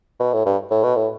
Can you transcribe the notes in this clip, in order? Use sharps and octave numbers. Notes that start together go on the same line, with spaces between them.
B2
A2
G2
A2
B2
A2